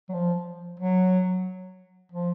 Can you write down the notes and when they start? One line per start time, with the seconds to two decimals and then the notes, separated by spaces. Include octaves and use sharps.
0.09 F#3
0.14 F3
0.79 F#3
2.12 F3